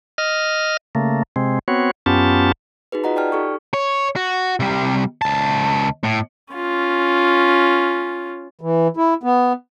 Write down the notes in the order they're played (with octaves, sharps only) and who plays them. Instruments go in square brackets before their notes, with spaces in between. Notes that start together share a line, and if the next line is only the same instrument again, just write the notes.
[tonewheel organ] D#5 F6
C#3 A3 A#3
C3 G#3 C4
B3 C4 F#4 C#5
F#2 B3 C#4 F4 G4 A5
[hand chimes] D#4 F#4 G#4 B4
F4 F#4 D#5 F#5 A#5
D5 G5 A5 F6
D#4 G4 A4 C#6
[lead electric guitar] C#5
F#4
C3 G3
C#2 A5
A2
[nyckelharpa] C#4 F4
[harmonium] E3
E4
B3